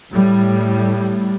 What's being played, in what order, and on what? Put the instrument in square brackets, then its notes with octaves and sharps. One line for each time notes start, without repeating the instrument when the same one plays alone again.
[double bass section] A2 G3